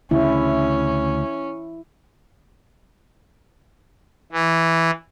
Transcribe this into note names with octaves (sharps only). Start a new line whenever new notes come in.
D2 C#3 C#4 E4
E3